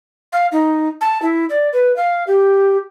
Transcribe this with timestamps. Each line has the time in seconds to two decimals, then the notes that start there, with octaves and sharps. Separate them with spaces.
0.32 F5
0.52 D#4
1.01 A5
1.22 E4
1.50 D5
1.73 B4
1.96 F5
2.27 G4